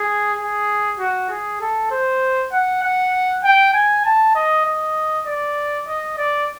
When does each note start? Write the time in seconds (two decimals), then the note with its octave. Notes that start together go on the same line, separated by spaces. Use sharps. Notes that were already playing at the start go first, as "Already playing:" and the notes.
Already playing: G#4
0.38 G#4
0.99 F#4
1.30 G#4
1.61 A4
1.91 C5
2.52 F#5
2.83 F#5
3.44 G5
3.74 G#5
4.05 A5
4.35 D#5
4.65 D#5
5.27 D5
5.88 D#5
6.18 D5